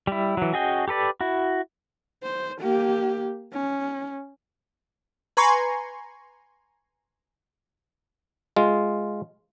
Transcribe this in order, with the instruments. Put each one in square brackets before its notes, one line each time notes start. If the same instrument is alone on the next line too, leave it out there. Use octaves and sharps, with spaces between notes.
[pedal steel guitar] G3 E4
E3 F#3
C#4 F#4 G#4 D#5 G5
G4 A4 B4 D5
E4 F#4
[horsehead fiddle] C5
A#3 G4
C#4
[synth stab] B4 G#5 A#5 C6 C#6
[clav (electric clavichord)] G#3 F4